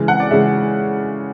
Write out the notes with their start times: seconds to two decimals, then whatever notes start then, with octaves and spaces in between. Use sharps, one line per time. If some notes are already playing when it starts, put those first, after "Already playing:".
Already playing: C#3 E3 G#3
0.08 F#5
0.20 D5
0.31 C#3 E3 G#3 E5